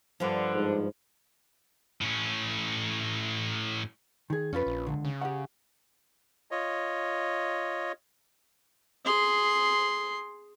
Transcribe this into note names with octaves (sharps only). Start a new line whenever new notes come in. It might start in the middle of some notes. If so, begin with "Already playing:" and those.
G2 D3 F3
G#2
A2 C#4
D#3 G#4
F2 C#4 F4 B4
A#1
C#2 D3
C#3
G4 F#5
F4 C#5 D#5
G#4 C6